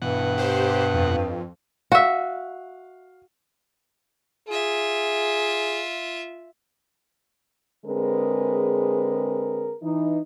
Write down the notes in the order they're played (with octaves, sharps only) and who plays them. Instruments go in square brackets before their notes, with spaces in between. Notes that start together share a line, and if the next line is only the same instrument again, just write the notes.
[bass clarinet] G2 [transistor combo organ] B2 F#5 [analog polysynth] E3
[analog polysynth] G4 C5
F2
[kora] F#4 E5 [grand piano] F5
[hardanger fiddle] F4 E5 [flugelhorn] G#4
[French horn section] D3 G#3 C4 G#4 A#4 B4
E3 D#4